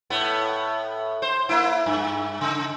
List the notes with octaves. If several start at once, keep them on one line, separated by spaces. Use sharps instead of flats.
A2 B3
C5
A#3 E4
G2
C#3